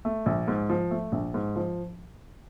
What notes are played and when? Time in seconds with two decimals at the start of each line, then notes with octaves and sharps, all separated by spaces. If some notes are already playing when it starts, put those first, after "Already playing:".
0.05 A3
0.26 A#1
0.48 G#2
0.70 F3
0.91 A3
1.12 A#1
1.34 G#2
1.56 F3